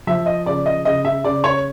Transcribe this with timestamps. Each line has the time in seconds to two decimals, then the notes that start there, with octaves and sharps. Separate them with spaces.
0.07 F3 E5
0.26 D#5
0.46 C#3 D5
0.66 D#5
0.85 C#3 D#5
1.05 E5
1.24 C#3 D5
1.44 C#5